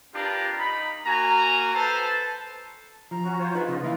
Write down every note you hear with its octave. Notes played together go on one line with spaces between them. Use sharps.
C4 D4 F4 G4 A#4 B4
D#4 B5
A#3 F#4 A#4 G#5 A#5
A4 B4 C5 A5
F3 A#5
C#4 F#4
F4 C5 C#5
D#4 F4 G#4 B4
C#3 D#4
C#2 E3 E4 F5